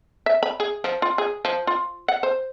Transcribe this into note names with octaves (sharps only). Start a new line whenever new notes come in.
E5
B5
G#4
F3
F4
G#4
F3
F4
F#5
C5